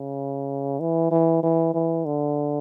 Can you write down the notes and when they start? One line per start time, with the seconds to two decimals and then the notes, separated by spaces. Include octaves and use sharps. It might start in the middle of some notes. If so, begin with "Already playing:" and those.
Already playing: C#3
0.80 E3
1.11 E3
1.43 E3
1.74 E3
2.05 D3